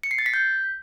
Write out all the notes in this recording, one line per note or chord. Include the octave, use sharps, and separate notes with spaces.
C#7
C7
A6
B6
G6